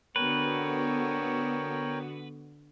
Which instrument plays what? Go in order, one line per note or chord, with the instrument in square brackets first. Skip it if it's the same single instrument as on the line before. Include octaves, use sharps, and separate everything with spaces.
[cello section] D3 B3 F#4 [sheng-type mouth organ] A#4 C#5 G5 [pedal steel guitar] B4